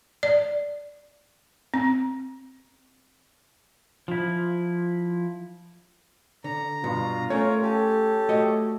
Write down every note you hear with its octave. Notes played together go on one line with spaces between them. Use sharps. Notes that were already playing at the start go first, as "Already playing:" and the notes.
D5
C4
F3 E4
D3 A#5
G2 B2 F4
A3 C#4 A#4 C#5
G4 A4
A3 F#4 D#5